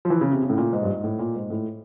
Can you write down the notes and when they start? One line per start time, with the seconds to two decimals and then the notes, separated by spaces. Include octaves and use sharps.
0.05 F3
0.10 E3
0.21 C#3
0.31 C3
0.42 C#3
0.50 A2
0.58 A#2
0.73 G#2
0.83 G2
0.88 G#2
1.04 A2
1.19 A#2
1.35 G#2
1.50 A2